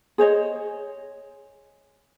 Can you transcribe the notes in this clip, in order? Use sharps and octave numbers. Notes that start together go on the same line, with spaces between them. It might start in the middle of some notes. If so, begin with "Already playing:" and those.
G#4 C5 C#5 D#5